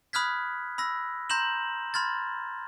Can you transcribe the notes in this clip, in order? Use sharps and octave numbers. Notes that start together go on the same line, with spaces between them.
B5 D#6 F6 F#6 G#6 B6
B5 E6 A#6
A#5 C6 G6 A#6 E7 F#7
B5 C6 F6 G#6 A6